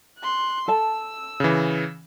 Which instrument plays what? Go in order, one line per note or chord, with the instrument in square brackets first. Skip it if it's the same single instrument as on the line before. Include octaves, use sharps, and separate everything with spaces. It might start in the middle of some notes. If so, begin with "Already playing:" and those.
[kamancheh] C6 F#6
[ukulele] A4 A5 [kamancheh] E6
[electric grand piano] C#3 E3